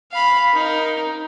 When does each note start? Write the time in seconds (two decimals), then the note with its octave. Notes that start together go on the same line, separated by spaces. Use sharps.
0.12 F5 B5
0.53 D#4 A#4